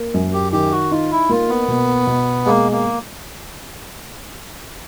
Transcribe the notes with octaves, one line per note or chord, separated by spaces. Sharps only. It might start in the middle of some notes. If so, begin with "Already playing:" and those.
Already playing: A#3
F#2
G4
D#3 G4
F#4
D#4 F4
E4
A#3 F4
B3
B2
B2
G#3 A#3
A#3